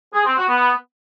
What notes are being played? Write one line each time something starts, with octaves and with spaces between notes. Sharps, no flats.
G#4
C4
F#4
B3